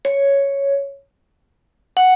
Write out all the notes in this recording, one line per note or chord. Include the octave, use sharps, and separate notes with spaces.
C#5
F#5